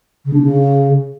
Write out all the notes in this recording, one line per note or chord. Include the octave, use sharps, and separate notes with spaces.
C#3
D4
C#3